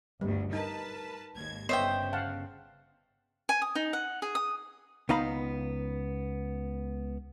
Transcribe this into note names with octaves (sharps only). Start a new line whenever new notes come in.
G1 D2 G3
D#4 A#4 B4 A5
G#1 D#2 G#6
G1 C#3 B3 C5 C#5 D#5 E5 G5
F5 F#5 A5
G#5
D#6
D#4
F#5
G#4
D#6
C#2 B3 D#4 F5 A#5 B5